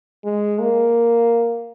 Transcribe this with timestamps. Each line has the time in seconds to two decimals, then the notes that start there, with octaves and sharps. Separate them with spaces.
0.25 G#3
0.60 A#3